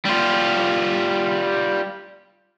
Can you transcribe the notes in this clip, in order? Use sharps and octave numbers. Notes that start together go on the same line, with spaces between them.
G3 F4